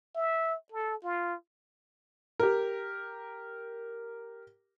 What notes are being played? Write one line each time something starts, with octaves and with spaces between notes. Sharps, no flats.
E5
A4
F4
G4 A#4